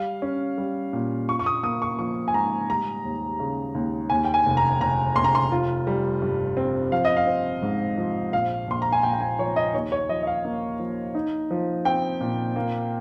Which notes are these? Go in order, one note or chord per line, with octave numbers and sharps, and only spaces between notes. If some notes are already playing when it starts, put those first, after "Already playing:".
Already playing: G3 F5
C#4
G3
A#2
F4 C#6
C#6
D#6
A#3 D#6
C#6
F3 C#6
G#5
G#2 A#5
G3 A#5
D#2
C#3
D#2
D#2 G#5
G5
G#5
F1
A#5
F1 A#5
F1 C6
A#5
C6
F4
G3
G2
C4
F3 F5
D#5
F5
C4
G#2
F3
A#1 F5
A#1 C6
A#5
G#5
A#1 G5
G5
G#5
F3 C#5
D#5
D#2 C#5
C#5
F3 D#5
D#5
F5
A#3
F3
D#4
F3
C4 G5
A#2
A#3